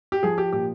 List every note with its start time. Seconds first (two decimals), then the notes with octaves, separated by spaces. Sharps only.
0.12 G4
0.23 F3 G#4
0.38 G4
0.53 A#2 G4